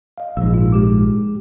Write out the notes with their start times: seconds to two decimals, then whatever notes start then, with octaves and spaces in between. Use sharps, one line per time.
0.18 D#5 F5
0.37 A#1 G#2 E6
0.54 F4
0.72 G#3 G4 D6